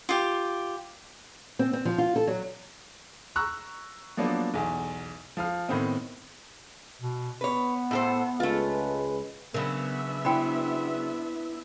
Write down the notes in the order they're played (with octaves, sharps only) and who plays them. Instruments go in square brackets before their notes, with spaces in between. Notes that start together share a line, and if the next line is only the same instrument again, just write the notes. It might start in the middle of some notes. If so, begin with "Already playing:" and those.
[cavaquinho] F4 G4
[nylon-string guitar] C4
C4
F3
F4
A4
F#3
[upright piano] A#5 C#6 E6 F#6
F3 F#3 A#3 B3 D4
B1 E2
F3 F5 F6
A2 D#3 B3 C4 D#4
[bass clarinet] B2
[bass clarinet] B3 [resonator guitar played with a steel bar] B4 C#5
[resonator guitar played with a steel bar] A2 A4 C5
[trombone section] C#2 G#3 B4 [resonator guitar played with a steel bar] A3 F4
[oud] C#3 F#3 [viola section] B3 D4 E5 [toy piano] A#4 B5
[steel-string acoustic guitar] E4 B4 C5 [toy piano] G5 B5